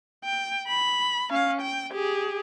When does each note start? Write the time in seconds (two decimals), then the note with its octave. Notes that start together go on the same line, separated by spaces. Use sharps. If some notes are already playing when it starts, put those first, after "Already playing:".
0.24 G5
0.68 B5
1.30 C#4 F5
1.61 G5
1.92 G4 G#4